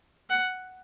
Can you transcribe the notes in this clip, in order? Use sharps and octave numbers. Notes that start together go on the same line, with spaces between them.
F#5